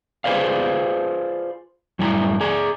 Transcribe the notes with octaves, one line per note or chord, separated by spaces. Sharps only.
F4 G#4 B4 C5 D5 F5
F#2 A2 G3 E4 G#5 A#5
G#4 D5 A#5